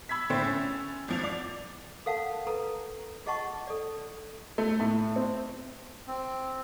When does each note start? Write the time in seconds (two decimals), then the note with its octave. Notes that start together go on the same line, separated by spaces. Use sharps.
0.09 B5 E6 G#6 B6
0.30 A2 D3 E4 C5 G5 A6
0.44 C#4
1.08 G#1 F3 F7
1.23 D5
2.06 A4 A#4 F5 F#5 A5
2.47 A4 B4 A#5
3.26 F4 G#4 D#5 F#5 A5 C#6
3.67 A4 D5
4.58 A3
4.80 A2
5.16 C4
6.08 C4